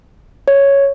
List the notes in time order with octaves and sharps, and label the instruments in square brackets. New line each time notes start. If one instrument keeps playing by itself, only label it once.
[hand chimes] C#5